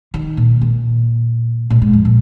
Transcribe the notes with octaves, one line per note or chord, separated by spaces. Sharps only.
D#3
A#2
A#2
A#2
G#2
F2
A#2